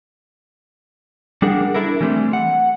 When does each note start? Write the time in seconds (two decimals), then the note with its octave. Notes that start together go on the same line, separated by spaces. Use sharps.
1.42 G3 D4 G#4 A#4 F#5
1.75 D4 E4 A4 A#4
2.01 E3 G3 A3 A#3 C4
2.33 F#5